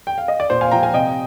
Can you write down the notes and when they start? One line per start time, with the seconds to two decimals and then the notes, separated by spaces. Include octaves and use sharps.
0.07 G5
0.18 F5
0.28 D#5
0.40 D5
0.50 A#2 C5
0.61 F5 G#5
0.71 F3 G5 A#5
0.83 F5 G#5
0.94 C3 D#5 G5